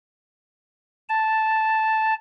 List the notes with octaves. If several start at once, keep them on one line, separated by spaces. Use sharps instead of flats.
A5